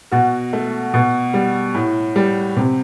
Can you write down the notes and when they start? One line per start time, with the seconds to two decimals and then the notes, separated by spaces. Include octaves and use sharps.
0.12 B2 F#4
0.53 A3
0.94 B2
1.34 G3
1.74 A2
2.16 G3
2.57 C3